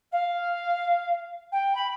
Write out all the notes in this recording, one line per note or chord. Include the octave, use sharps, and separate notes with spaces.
F5
G5
B5